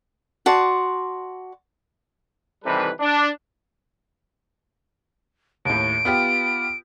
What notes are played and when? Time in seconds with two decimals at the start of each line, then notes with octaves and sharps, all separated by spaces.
0.46 F#4 D5 A5 C6
2.64 C3 D#3 E3 G3 A4 B4
3.00 D4
5.65 D#2 A2 D7
6.05 B3 F4 G4